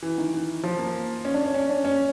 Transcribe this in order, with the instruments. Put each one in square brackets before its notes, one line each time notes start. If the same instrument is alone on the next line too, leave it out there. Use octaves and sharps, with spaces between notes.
[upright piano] E3
D#3
E3
F3
A#3
C#4
D4
C#4
C#4
D4
C#4